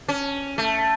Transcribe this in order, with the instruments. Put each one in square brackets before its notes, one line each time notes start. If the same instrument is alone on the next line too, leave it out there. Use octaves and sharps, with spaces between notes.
[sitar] C#4
A3